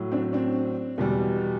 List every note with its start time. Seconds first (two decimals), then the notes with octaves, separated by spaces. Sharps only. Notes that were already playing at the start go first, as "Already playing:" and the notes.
Already playing: A2 F#3
0.12 C4 D4
0.33 C4 D4
0.98 E2 B2 G3